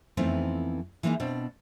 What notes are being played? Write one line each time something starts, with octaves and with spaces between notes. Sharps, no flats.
F2 E3 A3 B3 C4 D#4
E3 G#3 A#3 D4 D#4
B2 C4 D4